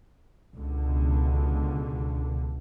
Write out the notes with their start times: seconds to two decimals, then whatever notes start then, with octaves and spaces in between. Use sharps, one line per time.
0.54 C#2 B2 D3